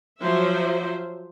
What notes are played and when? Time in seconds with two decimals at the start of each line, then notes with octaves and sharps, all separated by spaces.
0.20 F3 F#3 C5 E5